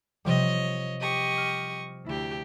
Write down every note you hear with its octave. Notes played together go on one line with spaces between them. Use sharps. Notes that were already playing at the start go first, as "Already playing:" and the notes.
C3 F3 G3 C#5 D#5
G4 D#5 C#6
F6
D2 E4 G4